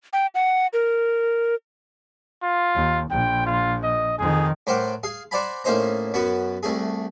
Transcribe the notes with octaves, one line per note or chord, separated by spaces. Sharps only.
G5
F#5
A#4
F4
D#2
A#1 G5
F4
D#5
F2 D#3 G#4
A2 A#4 C5 F#5 G5 D6
G#4 F5
C5 D5 F#5 G#5 A#5 B5
A2 A#3 C#4 D#4 C5 A#5
F#2 B3 F#4 C#6
C2 A3 G#4